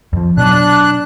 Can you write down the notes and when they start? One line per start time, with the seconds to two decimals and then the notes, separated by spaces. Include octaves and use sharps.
0.13 F2 F3
0.37 B2 F#3 D4 F#6